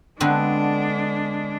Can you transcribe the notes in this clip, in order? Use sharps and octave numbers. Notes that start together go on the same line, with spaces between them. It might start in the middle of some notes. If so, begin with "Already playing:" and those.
D3 G#3 B3 C4 D4